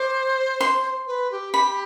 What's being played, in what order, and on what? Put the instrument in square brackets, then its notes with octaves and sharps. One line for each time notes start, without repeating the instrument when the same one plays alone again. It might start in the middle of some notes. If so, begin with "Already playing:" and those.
Already playing: [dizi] C5 [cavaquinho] D6
[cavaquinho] C6
[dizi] B4
G4
[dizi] G4 [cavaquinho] B5